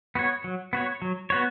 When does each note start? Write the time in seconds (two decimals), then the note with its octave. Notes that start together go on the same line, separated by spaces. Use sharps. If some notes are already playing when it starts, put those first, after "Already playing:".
0.15 B3 F#4 C#5
0.44 F#3
0.73 B3 F#4 C#5
1.02 F#3
1.30 B3 F#4 C#5